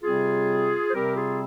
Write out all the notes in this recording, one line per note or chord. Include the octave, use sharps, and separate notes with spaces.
C3 G3 C4 F4 G#4
C5
C3 G3 C4 G4 A#4
F4 G#4